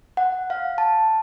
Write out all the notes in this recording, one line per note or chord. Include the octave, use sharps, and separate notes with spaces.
F#5
F5
A5